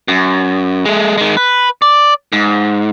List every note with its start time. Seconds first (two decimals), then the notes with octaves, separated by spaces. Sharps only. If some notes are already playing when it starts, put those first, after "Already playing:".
0.08 F#2
0.86 G#3 A3
1.18 D#3 G#3
1.37 B4
1.82 D5
2.33 G#2